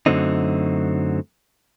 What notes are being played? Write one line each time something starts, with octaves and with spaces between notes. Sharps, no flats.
F#2 D3 F#3 A3 C4 D#4